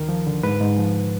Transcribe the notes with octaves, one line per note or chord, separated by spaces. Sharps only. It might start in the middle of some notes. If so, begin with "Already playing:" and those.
Already playing: D2 D#3 A#4
F3
D3
G#2 B4
G#2
F3